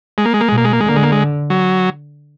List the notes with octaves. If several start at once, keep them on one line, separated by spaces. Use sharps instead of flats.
G#3
A#3
G#3
A#3
B2 G#3
A#3
G#3
A#3
G#3
D3 A#3
G#3
A#3
G#3
F#3